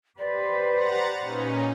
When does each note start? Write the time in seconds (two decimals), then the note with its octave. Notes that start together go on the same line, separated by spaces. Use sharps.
0.19 G4 B4 C5 D5
0.74 F#5 A#5 A6
1.20 A#2 C#4 D#4